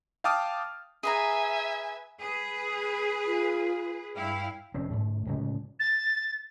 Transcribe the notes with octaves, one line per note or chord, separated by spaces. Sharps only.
F5 G5 A5 D6 D#6 F6
G#4 B4 E5 G#5 A#5
G#4 B4
F4
G2 E4 F5 G5
F1 C4 C#4
D2 G#2 G#3 A3
D1 C#3 G#3
A6